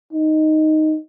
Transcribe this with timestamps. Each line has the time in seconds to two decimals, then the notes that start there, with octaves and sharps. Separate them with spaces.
0.13 D#4